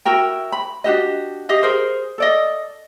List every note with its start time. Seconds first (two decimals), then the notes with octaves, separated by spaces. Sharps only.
0.05 E4 F#4 A#4 G5
0.52 B5
0.84 D4 F#4 G4 D#5
1.49 G4 D#5 F5
1.63 G#4 A#4 C5
2.18 A4 D5 D#5